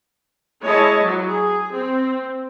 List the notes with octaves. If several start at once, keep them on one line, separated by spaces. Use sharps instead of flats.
G#3 E4 C#5 D#5 A5
F#3
G#4
C4